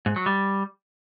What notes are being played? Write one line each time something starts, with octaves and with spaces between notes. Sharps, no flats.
G#2
F#3
G3